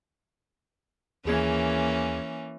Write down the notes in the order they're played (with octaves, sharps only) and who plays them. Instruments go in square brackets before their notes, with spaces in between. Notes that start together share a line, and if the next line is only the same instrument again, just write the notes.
[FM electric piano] D#2 G#4 G#6 [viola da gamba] E3 A#3 C#4